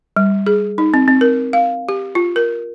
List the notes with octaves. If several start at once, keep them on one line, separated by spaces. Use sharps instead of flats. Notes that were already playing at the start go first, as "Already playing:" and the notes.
G3
G#4
D#4
C4
C4
A#4
F5
G4
F4
A#4